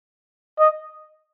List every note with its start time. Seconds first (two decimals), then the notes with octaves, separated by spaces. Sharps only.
0.59 D#5